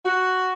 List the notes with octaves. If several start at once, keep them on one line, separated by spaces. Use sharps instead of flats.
F#4